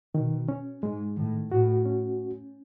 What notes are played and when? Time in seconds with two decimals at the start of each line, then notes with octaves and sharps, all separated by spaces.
0.15 B2 D#3
0.48 C#4
0.83 G#2 G#3
1.17 A2 D#3
1.51 A2 F#4
1.85 C#4